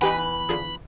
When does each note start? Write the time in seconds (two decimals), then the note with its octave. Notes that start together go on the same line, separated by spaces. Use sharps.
0.01 E2 D#4 G4 B4 F#5 G#5 B5
0.49 D3 F3 G#4